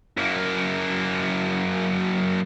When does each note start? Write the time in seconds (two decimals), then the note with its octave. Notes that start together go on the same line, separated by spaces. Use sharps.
0.17 F#2 A#3